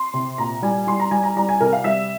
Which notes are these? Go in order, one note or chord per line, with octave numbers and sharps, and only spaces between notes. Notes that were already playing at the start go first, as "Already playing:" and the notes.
Already playing: C6
C3
A#2 A#5
G3 G#5
G3 C6
A#5
G3 G#5
A#5
G3 A#5
G#5
C3 A#4
F5
G3 E5